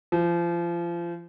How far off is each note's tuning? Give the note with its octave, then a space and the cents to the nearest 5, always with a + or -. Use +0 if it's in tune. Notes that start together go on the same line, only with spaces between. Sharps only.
F3 -30